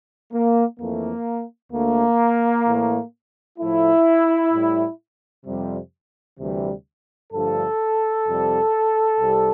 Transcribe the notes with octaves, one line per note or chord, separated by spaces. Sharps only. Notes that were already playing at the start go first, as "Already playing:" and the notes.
A#3
F2 E3 A3 A#3
D2 D3 A3 A#3
A2 E3 A3
A2 F3 A3 E4
A2 G3
F2 C3 G3
D2 C3 E3 G3
G2 D3 F3 A3 A4
F2 C3 G3
C2 C3 G3